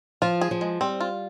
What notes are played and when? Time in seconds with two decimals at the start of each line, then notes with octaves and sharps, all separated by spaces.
0.22 F3 F4
0.41 G#4
0.51 F3
0.61 G#3
0.81 G3 C4
1.00 F4